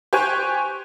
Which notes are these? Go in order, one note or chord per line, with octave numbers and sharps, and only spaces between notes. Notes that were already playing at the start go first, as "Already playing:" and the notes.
G4 C5 G5 G#5 C#6 F#6